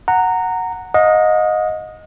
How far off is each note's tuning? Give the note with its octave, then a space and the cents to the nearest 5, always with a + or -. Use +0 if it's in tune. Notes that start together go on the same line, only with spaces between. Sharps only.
F#5 +0 A#5 -15
D#5 +0 F#5 -45